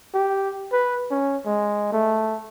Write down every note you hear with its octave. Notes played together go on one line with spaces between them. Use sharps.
G4
B4
C#4
G#3
A3